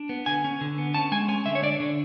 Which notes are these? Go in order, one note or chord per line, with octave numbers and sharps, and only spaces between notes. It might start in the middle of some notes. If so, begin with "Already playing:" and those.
Already playing: D4
B3
D3 G#5
C#4
D3
B3
C#4 A5
G#3 G#5
C#4 G#5
D3 E5
C#5
D4 D5
D3